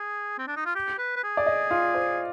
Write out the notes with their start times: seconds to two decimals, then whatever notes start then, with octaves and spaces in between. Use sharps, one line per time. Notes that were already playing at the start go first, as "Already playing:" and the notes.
Already playing: G#4
0.39 C4
0.48 D4
0.57 D#4
0.66 F4
0.75 G4
0.99 B4
1.16 B4
1.24 G#4
1.37 D5
1.46 D#5
1.71 F4
1.95 C5